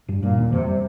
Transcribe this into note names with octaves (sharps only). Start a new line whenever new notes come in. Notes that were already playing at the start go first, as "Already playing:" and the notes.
G2 G3
G2 A#2 G3
D#2 D#3
F2 C3 F3
G3